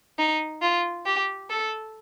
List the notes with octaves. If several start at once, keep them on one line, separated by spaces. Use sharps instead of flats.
D#4
F4
G4
A4